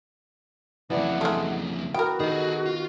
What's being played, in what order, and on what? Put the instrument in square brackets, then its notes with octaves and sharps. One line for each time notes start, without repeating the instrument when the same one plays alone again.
[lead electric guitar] F2 C#3 [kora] E3 D4 D5 [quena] F#5
[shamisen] G#3 A3 [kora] G#4
[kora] B3 [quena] F#4 [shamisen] A#4 G5
[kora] D#3 [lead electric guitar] G#4 A4
[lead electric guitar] F4